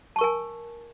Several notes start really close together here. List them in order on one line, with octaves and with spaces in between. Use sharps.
A5 C#6 A#4 G#5